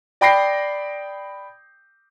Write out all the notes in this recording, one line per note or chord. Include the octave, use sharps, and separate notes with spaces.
D5 G5 B5 G6 A#6 C7